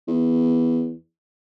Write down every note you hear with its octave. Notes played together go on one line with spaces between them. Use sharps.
E2